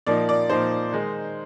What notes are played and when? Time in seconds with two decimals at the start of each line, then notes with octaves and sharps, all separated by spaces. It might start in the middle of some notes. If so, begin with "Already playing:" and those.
0.07 A#2 F3 A#3 D#4 D5
0.29 D5
0.50 A#2 F3 A#3 D#4 C5
0.92 D#3 G#3 D#4